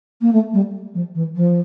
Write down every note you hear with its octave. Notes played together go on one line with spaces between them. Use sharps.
A#3
A3
G3
F3
E3
F3